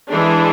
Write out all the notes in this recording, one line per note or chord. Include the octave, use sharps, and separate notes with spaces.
E3 G#3 D4 G#4